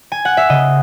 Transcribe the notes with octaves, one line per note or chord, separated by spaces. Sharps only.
G#5
F#5
E5
C#3 D#5